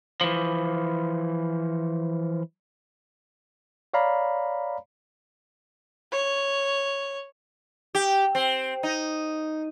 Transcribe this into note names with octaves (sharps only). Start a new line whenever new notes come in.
E3 F3
C#5 D5 F5 A#5 B5
C#5
G4
C4
D#4